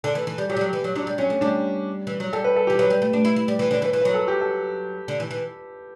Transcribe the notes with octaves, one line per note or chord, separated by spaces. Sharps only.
D3 A4
E3
E3
G3
F#3 G4
G3
F#3
E3
F#3
F#3 D4
G3
F#3 C#4
A3
G3 D4
E3
F#3
G3 A4
B4
A4
G4
E3
F#3 B4
G3
A3
D4
E4
E4
G3
E3
D3 B4
E3
B4
E3
F#3 B4
A4
G4
A4
D3
E3
E3